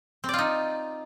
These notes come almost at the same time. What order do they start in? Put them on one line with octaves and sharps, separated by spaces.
C4 D5 F4 D#4